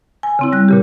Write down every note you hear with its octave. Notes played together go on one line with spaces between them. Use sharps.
G#5
C#3 C4 E4
G3 F#6
A#2 C#3 G4